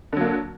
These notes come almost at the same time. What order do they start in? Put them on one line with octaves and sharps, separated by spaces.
D3 F#3 A#3